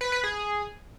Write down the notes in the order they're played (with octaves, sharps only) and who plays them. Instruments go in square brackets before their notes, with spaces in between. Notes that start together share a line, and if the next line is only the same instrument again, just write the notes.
[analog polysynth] B4
B4
G#4